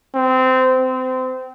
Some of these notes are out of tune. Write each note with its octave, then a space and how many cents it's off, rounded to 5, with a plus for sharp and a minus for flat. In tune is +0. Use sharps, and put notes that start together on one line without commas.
C4 -20
C4 -25